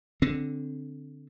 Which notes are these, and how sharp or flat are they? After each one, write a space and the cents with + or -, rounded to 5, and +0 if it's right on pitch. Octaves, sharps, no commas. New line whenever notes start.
D3 +0 C4 +0